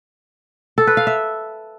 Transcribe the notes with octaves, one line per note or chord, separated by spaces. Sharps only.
A4
B4
F5
E5